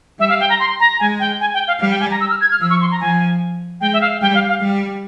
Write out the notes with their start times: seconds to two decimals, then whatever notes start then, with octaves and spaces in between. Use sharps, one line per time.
0.20 G3 E5
0.29 F5
0.40 G5
0.50 A#5
0.60 C6
0.80 A#5
0.99 G#3 G#5
1.20 G5
1.41 G#5
1.54 G5
1.68 F5
1.80 G3 F5
1.91 G5
2.00 G#5
2.11 A#5
2.20 E6
2.30 F6
2.41 G#6
2.51 F6
2.60 F3 E6
2.70 C#6
2.81 C6
2.91 A#5
3.00 F3 G#5
3.81 G#3 G5
3.93 E5
4.01 F5
4.21 G3 G5
4.35 F5
4.49 F5
4.61 G3